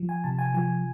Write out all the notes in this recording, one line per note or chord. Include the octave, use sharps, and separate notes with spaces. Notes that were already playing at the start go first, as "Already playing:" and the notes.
Already playing: F3
G#5
C3 A5
G#5
F3 G#5